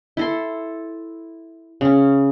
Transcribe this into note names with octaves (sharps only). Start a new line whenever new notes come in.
E4 A4 C6
C#3 C#4